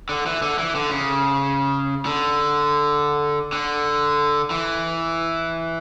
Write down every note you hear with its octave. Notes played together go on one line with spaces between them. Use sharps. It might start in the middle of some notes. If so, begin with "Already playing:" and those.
D3
E3
D3
E3
D3
C#3
D3
D3
E3